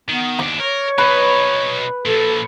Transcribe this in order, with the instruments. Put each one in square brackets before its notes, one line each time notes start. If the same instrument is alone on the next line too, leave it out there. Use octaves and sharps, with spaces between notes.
[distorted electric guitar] D#3 [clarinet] B3
[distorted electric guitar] D#2 D4 [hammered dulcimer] D6
[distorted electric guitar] A#4 [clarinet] C#5
[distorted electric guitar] B2 D#4 [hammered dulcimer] B4
[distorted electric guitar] A#2 F3 [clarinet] A4